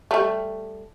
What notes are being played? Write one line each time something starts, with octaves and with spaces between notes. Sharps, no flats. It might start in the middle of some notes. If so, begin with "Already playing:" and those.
G3 A3